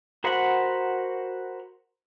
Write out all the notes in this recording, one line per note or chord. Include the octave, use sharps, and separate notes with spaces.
F#4 A#4 C5 F#5 B5